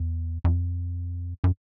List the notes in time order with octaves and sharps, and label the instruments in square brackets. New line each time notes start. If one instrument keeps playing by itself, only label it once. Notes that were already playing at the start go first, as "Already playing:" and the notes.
Already playing: [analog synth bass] E2
F2
F#2